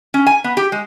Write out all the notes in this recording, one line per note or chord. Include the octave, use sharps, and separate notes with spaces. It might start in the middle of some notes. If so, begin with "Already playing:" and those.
C#4
G#5
B3
G4
G#3